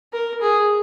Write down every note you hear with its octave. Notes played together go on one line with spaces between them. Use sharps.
A#4
G#4